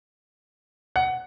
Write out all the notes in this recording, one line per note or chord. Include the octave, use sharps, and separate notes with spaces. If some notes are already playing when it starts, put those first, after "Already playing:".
F#5